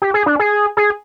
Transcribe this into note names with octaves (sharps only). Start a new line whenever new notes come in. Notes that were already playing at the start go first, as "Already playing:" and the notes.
G4
G#4
D4
G#4
G#4